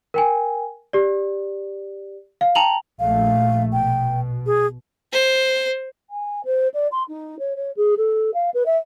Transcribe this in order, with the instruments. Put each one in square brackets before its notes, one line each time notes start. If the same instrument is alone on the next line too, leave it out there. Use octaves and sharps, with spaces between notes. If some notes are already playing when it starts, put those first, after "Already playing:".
[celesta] A#4 G5 G#5
G4 D5
F5
G5 A5 A#5 F7 F#7
[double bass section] A#1 A3 [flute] F5
[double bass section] B2 [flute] G5
[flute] G#4
[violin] C5
[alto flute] G#5
C5
D5
C6
D#4
C#5
C#5
G#4
A4
F5
B4
E5